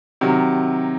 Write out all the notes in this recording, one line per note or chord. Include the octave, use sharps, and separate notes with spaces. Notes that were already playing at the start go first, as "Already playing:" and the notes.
C3 D#3 F#3